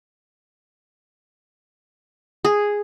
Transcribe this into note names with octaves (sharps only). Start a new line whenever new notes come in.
G#4